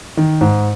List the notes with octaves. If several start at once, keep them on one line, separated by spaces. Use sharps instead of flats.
D#3
G#2